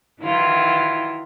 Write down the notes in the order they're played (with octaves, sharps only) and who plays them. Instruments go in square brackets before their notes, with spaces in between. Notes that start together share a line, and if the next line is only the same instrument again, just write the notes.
[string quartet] D#3 E3 F#3 E4 F4